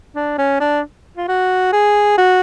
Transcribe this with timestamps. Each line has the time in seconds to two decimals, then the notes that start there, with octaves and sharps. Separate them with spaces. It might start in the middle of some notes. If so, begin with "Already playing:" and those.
0.15 D4
0.38 C#4
0.60 D4
1.17 F4
1.28 F#4
1.73 G#4
2.18 F#4